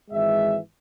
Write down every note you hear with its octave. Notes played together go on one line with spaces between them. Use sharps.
G#1 E3 G#3 E5